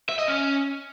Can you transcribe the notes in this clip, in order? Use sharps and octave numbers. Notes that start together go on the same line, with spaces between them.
E5
D#5
C#4